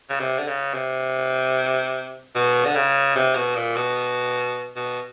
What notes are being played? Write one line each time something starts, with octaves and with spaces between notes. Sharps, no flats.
C#3
C3
D3
C#3
C3
B2
D3
C#3
C3
B2
A#2
B2
B2